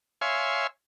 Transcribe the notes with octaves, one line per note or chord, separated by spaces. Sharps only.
C#5 E5 F5 G#5 C6